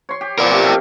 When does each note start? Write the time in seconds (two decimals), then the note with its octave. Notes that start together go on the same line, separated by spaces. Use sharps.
0.09 C#5 C6
0.21 G4
0.39 F3 B3 A#4 D5
0.51 C3
0.63 D#3 G4 A4